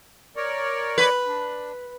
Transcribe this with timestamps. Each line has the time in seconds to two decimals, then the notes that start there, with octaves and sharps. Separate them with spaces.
0.36 A#4 C#5 D5
0.98 B4
1.27 D4